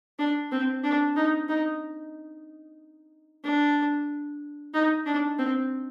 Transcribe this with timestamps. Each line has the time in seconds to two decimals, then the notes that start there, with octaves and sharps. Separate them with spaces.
0.19 D4
0.51 C4
0.84 D4
1.16 D#4
1.49 D#4
3.44 D4
4.74 D#4
5.06 D4
5.38 C4